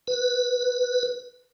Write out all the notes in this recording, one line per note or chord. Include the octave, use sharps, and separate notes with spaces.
B4